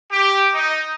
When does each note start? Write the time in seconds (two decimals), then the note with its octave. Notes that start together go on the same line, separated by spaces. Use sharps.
0.11 G4
0.54 D#4